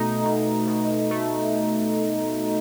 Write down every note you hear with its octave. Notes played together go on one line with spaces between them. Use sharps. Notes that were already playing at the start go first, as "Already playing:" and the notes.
Already playing: B2 A3 D#4
B2
B2
A3